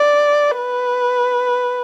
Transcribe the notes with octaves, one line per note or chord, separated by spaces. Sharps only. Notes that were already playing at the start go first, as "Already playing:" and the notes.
Already playing: D5
B4